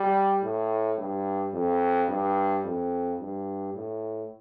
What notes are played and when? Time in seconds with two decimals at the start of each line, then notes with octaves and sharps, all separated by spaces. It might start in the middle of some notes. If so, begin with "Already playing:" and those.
Already playing: G3
0.43 A2
0.98 G2
1.53 F2
2.09 G2
2.64 F2
3.20 G2
3.74 A2